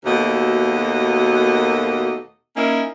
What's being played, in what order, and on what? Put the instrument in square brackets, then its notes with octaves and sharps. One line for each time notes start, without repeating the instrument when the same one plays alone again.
[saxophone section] D#2 B2 A3 A#3 F#4 D#5
A#3 C#4 D#4 E4 A#4